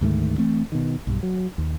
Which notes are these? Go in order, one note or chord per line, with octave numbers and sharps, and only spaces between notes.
D2 G#2 D#3 A3
E3 A3 C4
B2 D#3
B1 G2
F#3
D#2